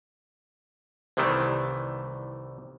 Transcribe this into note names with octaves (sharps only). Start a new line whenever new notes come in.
C2 C3 D#3 E3 A3